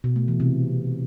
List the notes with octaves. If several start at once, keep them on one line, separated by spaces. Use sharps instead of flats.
B2
A3
E3
C3